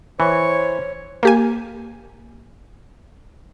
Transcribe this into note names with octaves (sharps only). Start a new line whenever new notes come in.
E3 C5 C#5 C#6
A#3 G4 G#5